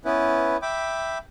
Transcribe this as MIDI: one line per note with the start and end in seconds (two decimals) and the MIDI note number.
0.05 0.57 59
0.05 0.57 61
0.05 0.57 64
0.05 0.57 71
0.62 1.18 76
0.62 1.18 79
0.62 1.18 83
0.62 1.18 86